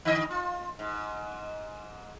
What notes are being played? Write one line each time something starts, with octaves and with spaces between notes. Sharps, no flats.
D3 D#5
F4
G#2